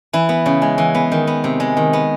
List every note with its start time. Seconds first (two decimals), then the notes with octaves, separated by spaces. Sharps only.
0.13 E3 E4
0.29 B3
0.46 C#3
0.62 G#3
0.78 E3
0.95 B3
1.12 D#3
1.27 B3
1.44 C3
1.60 G#3
1.77 D#3
1.93 B3